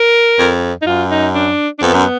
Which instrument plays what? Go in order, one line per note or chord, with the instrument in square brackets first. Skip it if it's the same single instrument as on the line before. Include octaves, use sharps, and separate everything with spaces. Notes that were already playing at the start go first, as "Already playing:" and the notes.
Already playing: [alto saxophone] A#4
[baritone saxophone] F2
[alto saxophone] D#4
[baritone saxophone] F#2 [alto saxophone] F4
[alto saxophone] D#4
D4
D4
[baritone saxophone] F2 [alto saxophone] B3
[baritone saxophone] F#2